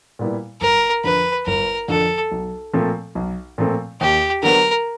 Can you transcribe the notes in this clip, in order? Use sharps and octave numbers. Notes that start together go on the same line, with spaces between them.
A#2 G3 B3 E4
G1 A#4
F2 D3 B4
G1 A#4
F2 D3 A4
B1
A#2 F3 A3 C4
B1
A#2 F3 A3 C4
D#2 G4
D3 F#3 B3 A#4